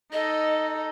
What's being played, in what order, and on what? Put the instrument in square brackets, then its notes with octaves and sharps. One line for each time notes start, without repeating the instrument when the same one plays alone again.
[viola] D#4 A4 [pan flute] D#5